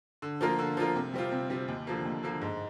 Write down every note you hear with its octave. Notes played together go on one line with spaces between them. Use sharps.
D3
F3 A#3 F4 A#4
D3
F3 A#3 F4 A#4
C3
G3 C4 F4
C3
G3 C4 F4
D#2
D3 F3 A#3
D#2
D3 F3 A#3
G#2